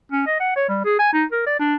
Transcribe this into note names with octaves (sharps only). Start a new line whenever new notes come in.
C#4
D#5
F#5
C#5
G3
G#4
G#5
D#4
A#4
D5
D4